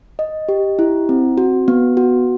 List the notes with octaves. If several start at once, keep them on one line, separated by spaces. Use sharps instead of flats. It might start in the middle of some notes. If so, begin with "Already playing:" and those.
D#5
G4
E4
C4
F#4
B3
F#4